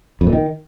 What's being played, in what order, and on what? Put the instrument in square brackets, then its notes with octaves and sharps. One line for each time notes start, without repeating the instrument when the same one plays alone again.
[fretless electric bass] F2
A#2
D#3